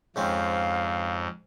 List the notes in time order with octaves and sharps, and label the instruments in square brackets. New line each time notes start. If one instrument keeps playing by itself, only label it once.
[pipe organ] F2 [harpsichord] G#2 C4 C#4 [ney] F5